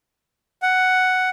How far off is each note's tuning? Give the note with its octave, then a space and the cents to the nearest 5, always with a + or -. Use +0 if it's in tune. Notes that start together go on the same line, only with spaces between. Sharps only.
F#5 +5